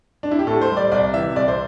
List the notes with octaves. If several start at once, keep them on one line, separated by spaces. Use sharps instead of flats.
D4
E4
G4
A2 A4
C5
G3
D5
C2 D5
C3 E3 E5
C2 D5
C5